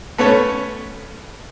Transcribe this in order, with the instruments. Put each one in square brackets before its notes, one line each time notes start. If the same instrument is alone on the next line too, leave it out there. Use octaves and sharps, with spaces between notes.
[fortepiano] A3 B3 C#4 C#5